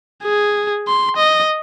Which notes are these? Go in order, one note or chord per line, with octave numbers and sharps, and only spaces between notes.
G#4
C6
D#5